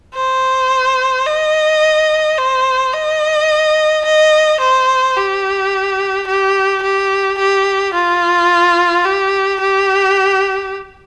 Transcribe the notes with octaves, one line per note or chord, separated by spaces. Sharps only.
C5
D#5
C5
D#5
D#5
C5
G4
G4
G4
G4
F4
G4
G4